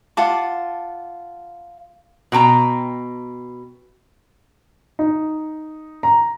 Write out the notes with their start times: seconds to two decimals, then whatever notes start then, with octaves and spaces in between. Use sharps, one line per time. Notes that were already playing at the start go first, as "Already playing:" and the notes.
0.17 F4 F#5 A5 D6
2.32 B2 G5 A5 A#5
4.99 D#4
6.03 A#5